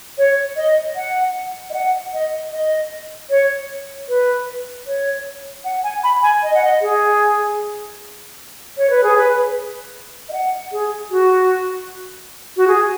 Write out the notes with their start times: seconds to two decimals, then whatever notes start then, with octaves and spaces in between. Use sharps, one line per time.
0.18 C#5
0.56 D#5
0.96 F#5
1.70 D#5
1.74 F#5
2.13 D#5
2.51 D#5
3.30 C#5
4.09 B4
4.87 C#5
5.65 F#5
5.84 G#5
6.04 B5
6.23 G#5
6.43 D#5
6.54 F#5
6.65 D#5
6.81 G#4
8.78 C#5
8.90 B4
9.04 G#4
9.18 B4
10.29 D#5
10.33 F#5
10.72 G#4
11.11 F#4
12.57 F#4
12.68 G#4